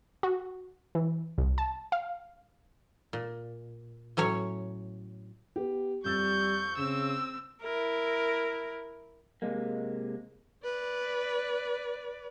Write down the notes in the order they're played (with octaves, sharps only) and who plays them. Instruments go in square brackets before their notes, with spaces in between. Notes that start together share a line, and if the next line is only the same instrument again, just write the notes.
[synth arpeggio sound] F#4
E3
C2
A5
F5
[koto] A#2
A2 F#3 C#4 C#5
[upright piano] B3 G4
[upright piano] F2 E6 A6 [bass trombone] G3 [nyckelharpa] C#6 [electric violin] G6
[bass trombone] C#3 [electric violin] C4 E6 [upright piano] E7
[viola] E4 A#4
[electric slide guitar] C3 G#3 A#3
[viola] B4 D5